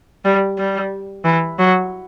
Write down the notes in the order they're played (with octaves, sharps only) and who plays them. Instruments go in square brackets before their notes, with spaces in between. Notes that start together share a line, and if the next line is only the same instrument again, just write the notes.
[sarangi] G3
G3
E3
F#3